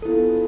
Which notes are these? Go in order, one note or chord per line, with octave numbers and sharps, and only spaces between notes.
B3 D4 E4 F4 A4